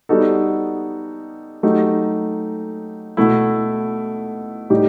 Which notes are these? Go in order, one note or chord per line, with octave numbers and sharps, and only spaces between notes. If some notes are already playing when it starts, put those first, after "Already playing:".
G3 B3 D#4 F#4 A4
F#3 A3 D#4 G4
B2 A3 E4
A2 G3 D#4 G4